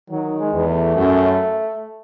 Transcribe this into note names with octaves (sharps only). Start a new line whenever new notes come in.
D#3 F#3
G#3
E2
A3
F#2